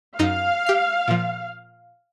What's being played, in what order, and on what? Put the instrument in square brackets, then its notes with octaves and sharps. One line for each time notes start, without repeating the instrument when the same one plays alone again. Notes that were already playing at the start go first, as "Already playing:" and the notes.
[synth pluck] F#2 D#4 A#5 [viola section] F5
[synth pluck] G4 C7
A#2 F3